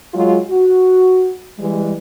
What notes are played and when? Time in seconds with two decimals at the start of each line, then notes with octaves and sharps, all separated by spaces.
0.14 F#3 G#3 F4 G#4
0.50 F#4
1.59 E3 G3 G#3